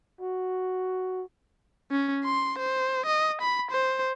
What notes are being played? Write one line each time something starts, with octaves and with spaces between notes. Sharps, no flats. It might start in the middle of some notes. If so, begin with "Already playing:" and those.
F#4
C#4
C6
C5
D#5
B5
C5